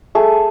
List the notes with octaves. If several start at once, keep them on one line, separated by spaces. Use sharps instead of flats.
A3 G#4